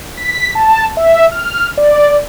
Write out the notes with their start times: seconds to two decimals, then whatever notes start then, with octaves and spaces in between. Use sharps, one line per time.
0.17 B6
0.55 A5
0.97 E5
1.32 F6
1.77 D5